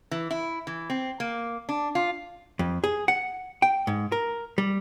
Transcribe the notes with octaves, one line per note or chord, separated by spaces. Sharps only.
E3
E4
E3
C4
A#3
D4
F4
F2
G#4
F#5
G5
G#2
A#4
G3